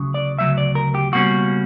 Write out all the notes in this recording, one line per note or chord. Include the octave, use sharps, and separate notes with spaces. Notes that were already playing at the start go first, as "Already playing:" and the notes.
Already playing: D2 C#3 F#3
D5
D2 C#3 F#3 E5
D5
A#4
G4
C#2 B2 G3 A#3 C#4 F#4